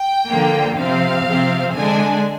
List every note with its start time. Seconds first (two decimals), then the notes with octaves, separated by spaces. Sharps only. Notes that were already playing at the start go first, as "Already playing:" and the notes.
Already playing: G5
0.29 D3 F3 A#3
0.77 C3 F3 C4 F5
1.25 C3 F3 C4
1.74 D3 G#3 D4 G#5